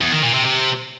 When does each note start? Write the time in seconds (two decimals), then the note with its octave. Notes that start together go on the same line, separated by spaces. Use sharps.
0.01 E2
0.12 D#3
0.23 A#2
0.34 C3
0.45 C3